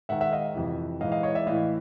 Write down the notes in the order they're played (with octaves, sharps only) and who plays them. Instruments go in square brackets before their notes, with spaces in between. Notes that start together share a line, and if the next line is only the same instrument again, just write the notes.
[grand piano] G#2 D#3 E5 F#5
E5 F#5
D#5 F5
F2 C3 E3
G#2 E3 D#5 F5
D#5 F5
C#5 D#5
D5 E5
A2 E3 D#5 F5